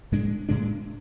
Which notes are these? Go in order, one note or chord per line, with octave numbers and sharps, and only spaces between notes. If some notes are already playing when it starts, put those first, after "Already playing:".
A2 G#3 D4
A2 G#3 D4